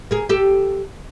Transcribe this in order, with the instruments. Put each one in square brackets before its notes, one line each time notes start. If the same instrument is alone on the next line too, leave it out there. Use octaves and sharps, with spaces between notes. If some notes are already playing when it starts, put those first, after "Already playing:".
[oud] G#4 A#4
G4 A4